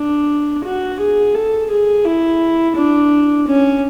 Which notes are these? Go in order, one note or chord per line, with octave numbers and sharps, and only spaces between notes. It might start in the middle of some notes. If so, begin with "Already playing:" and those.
Already playing: D4
F#4
G#4
A4
G#4
E4
D4
C#4